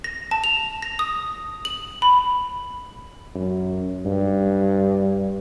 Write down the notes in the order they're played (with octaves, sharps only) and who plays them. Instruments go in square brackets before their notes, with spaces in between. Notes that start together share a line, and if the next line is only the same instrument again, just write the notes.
[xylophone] A#6
A5
F7
A#6
D#6
F#7
B5
[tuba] F#2
G2